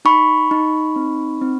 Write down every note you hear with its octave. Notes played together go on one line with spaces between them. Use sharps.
D#4 B5 C#6
D#4
C4
C4